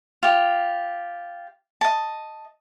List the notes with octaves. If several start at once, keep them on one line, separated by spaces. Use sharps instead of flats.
F4 G4
D#5 A5